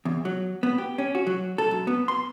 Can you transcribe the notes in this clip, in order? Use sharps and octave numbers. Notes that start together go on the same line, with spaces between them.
E2
F#3
B3
G4
C#4
F#4
F#3
A4
F#2
B3
C6